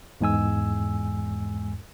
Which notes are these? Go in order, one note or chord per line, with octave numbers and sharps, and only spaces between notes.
E2 G#2 G#3 G#5 E6